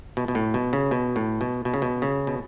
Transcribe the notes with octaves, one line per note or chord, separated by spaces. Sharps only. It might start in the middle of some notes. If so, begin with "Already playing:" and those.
B2
B2
A2
B2
C#3
B2
A2
B2
B2
C#3
B2
C#3
B2